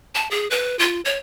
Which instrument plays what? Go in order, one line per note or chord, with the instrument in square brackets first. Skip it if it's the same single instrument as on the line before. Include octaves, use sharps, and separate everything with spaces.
[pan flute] A5
G#4
B4
F4
C#5